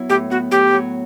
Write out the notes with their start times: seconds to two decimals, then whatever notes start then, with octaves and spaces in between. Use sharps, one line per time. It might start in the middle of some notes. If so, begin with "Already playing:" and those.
Already playing: F#3 B3 E4
0.09 A2 G4
0.30 B3 F#4
0.51 A2 G4
0.73 F#3